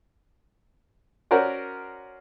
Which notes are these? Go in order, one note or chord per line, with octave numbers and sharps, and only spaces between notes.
C#4 F#4 A#4 C5 D5